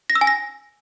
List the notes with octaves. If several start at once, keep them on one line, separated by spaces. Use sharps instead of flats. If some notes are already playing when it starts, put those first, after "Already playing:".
A#6
E6
G#5
A#6